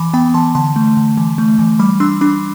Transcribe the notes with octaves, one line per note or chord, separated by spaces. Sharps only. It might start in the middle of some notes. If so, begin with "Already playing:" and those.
Already playing: E3 B5 D6
B3 G5 B5
E3 A5 C6
D3 A5 C6
A3
D3
E3
A3
E3
G3 B5 D6
D4 C6 E6
D4 B5 D6